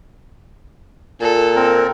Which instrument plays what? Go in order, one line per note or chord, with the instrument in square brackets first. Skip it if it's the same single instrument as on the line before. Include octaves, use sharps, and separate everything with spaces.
[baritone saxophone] A#2 [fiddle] A4
[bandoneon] C4 A#4